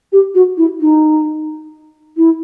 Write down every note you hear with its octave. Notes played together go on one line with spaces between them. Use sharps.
G4
F#4
E4
D#4
E4